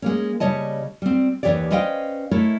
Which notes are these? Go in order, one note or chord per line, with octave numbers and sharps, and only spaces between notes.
G#3 A#3 C#4
C#3 G3 C#5 D#5 A5
G3 C4
D#2 G#2 E3 G4 C#5 D5
C#4 B4 C5 D#5 F5 G5
A3 E4 A#4 C#5